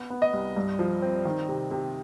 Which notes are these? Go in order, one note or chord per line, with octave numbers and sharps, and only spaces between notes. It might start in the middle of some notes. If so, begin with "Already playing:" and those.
Already playing: B3
B3
D#5
C2
G2
F3
C4
D#3
C3
C3